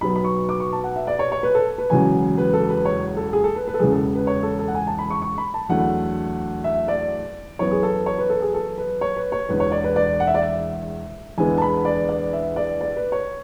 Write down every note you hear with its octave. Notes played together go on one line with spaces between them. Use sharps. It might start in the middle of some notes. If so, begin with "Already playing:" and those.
B1 B2 F#3 B3 B5
B5
C#6
D6
C#6
A5
F#5
E5
D5
C#5
C#5
B4
A4
B4
E1 E2 C#3 F#3 G#5
B4
A4
B4
C#5
A4
G#4
A4
B4
B4
A4
E1 E2 C#3 G#4
A4
B4
C#5
A4
A4
F#5
G#5
A5
B5
C#6
C#6
B5
A5
E2 D3 F#3 A3 F#5
E5
D5
F#2 E3 B3 C#5
G#4
A4
C#5
B4
A4
G#4
A4
B4
C#5
B4
C#5
E1 E2 D3 B4
C#5
D5
B4
D5
F#5
E5
D5
E5
E2 D3 G#3 B3 G#5
A5
B5
D5
D5
E5
D5
D5
B4
C#5